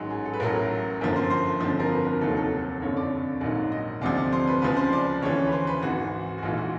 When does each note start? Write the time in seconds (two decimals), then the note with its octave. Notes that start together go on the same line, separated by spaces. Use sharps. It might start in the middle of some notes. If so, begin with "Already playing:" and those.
Already playing: A1 G#2 D#3 F#3 G#4
0.10 G#4
0.25 A4
0.34 B4
0.40 A1 A2 F#3 A#4
1.01 G1 F#2 D3 F3 A#4
1.16 C5
1.30 C5
1.61 G1 F2 D3 F3
1.80 A#4
1.92 B4
2.06 A#4
2.21 F1 D#2 D#3 F#3 A4
2.37 A4
2.82 F#1 F2 D3 C#5
2.97 D5
3.41 A#1 G#2 D#3 F#3
3.72 D#5
4.01 D2 C3 F3 D5
4.17 D5
4.33 C5
4.47 B4
4.62 C#2 C#3 F3 B4
4.77 C5
4.93 D5
5.22 D2 C#3 E3 C#5
5.47 B4
5.52 C5
5.67 B4
5.82 G#1 G#2 E3 F#4
6.38 F#4
6.42 A#1 G#2 E3 F4
6.57 F#4